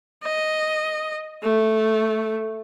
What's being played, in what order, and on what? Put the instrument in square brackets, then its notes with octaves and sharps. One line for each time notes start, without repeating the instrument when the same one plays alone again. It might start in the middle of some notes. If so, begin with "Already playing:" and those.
[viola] D#5
A3